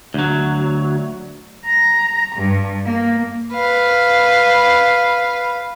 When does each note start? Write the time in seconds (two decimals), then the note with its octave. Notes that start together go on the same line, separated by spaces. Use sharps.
0.14 D2 F#3
1.64 A#5
2.36 G2
2.85 A#3
3.54 B4 F5